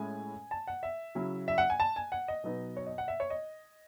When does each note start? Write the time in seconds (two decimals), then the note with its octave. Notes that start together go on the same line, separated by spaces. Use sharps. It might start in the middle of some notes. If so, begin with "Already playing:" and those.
Already playing: A2 G#3 C#4 E4 G#5
0.51 A5
0.67 F#5
0.83 E5
1.15 C#3 F#3 C#4 E4
1.48 E5
1.58 F#5
1.70 G#5
1.80 A5
1.96 G#5
2.12 F#5
2.28 D#5
2.44 B2 F#3 B3 D#4
2.77 C#5
2.87 D#5
2.98 F#5
3.08 E5
3.20 C#5
3.30 D#5